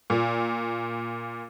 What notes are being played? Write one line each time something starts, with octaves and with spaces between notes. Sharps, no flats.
A#2